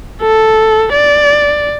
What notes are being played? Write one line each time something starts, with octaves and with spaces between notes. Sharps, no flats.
A4
D5